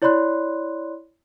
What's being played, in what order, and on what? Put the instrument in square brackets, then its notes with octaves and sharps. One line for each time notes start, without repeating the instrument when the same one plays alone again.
[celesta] E4 C#5 D5 B5 C6 F#6